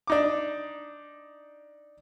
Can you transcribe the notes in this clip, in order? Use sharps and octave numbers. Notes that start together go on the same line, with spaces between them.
D4 D#4 D6